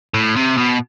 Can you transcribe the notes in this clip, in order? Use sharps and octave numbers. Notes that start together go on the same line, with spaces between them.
A2
C3
B2